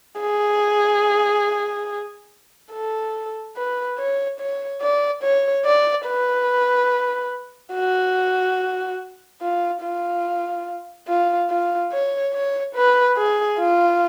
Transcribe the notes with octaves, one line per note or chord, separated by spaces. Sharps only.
G#4
A4
B4
C#5
C#5
D5
C#5
D5
B4
F#4
F4
F4
F4
F4
C#5
C#5
B4
G#4
F4